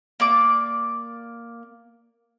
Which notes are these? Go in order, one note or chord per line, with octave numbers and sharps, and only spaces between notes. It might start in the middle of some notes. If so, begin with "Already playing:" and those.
A#3 D5 D6